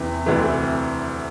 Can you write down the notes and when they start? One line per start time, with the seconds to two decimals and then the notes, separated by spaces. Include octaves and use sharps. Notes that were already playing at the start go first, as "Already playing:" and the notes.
Already playing: E2 C3 E3
0.26 D2 C3 E3